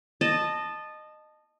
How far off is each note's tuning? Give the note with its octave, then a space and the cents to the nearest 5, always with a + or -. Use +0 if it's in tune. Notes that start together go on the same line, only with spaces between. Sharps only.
D#5 -20 A5 +0